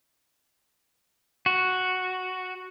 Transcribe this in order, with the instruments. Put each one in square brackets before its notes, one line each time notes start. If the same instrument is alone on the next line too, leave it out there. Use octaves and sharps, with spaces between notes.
[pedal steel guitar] F#4